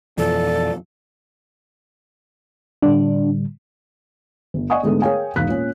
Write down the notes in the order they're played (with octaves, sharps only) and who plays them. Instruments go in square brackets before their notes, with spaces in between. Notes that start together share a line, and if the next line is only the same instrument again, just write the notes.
[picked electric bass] F2 B2 E3 [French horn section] F3 [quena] A4 [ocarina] D5
[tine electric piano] A2 D3 G3 [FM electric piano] D4
[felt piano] G1
D5 D#5 F#5 G#5 C#6 D#6
G#2 D3 G#3 A3 B3
G#4 A#4 C#5 F5 G5 G#5
E1 G#2 F5 F#6 B6
A#2 C#4